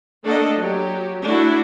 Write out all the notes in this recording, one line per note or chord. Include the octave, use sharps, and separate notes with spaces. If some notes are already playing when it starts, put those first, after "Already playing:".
A3 A#3 D4 A4 D#5 F#5
F#3 G4
A3 D4 E4 F#4